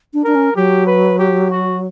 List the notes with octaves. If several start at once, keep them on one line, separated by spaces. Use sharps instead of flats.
D4
D4 A#4
C#4
F#3 G4
B4
G4
F#4